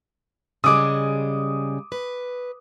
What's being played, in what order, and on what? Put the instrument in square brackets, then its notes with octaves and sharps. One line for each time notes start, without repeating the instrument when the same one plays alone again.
[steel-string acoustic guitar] C#3 G3 G#3 [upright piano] D6 D#6
[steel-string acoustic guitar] B4